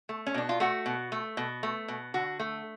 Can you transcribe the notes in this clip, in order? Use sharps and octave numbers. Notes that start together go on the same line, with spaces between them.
A3
C#4
B2 D4
F4
A3 F#4
B2
A3
B2
A3
B2
D3 F#4
A3